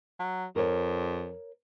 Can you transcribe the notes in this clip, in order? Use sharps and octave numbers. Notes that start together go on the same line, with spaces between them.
F#3
F2 A#4 C#5